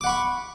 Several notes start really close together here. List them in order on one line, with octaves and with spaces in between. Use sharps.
D6 F#5 B5 C#6